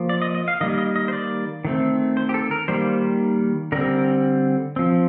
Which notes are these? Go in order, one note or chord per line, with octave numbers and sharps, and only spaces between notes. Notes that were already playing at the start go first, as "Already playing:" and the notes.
Already playing: F3 A#3
D5
D#5
D#5
F5
D#3 G3 A#3 D#5
D#5
D#5
C5
D5
D#3 A3 C4
C5
G4
A4
A#4
D#3 G3 A#3 C5
D3 G3 C4 A#4
F3 C4